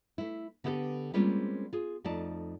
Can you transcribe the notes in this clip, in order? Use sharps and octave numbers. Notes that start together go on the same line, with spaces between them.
A3 E4
D3 B3 E4 F#4 G4 A4
G3 G#3 A#3 C4 C#4 F4
F4 G#4
F2 A3 D#4 F4 D5 A5